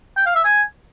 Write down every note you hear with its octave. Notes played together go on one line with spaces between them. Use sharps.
G5
F5
E5
G#5